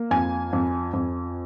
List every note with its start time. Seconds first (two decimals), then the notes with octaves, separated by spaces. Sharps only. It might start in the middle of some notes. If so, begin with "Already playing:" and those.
Already playing: A#3
0.11 F2 G#5
0.53 F2
0.93 F2